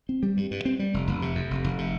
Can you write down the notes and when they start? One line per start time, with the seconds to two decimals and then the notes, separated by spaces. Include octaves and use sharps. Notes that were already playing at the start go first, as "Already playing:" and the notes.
0.09 C4
0.23 G3
0.37 G2
0.51 G2
0.65 C4
0.79 G3
0.94 F1
1.07 F1
1.22 C3
1.35 F2
1.51 F1
1.64 F1
1.78 C3